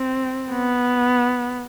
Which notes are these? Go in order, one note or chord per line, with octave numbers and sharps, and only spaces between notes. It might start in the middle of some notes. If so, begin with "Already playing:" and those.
Already playing: C4
B3